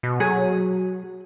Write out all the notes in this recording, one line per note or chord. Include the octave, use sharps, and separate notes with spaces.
B2
F#3 G#4